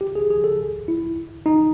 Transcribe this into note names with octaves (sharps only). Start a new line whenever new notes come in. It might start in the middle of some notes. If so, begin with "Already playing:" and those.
G4
G#4
G#4
A4
E4
D#4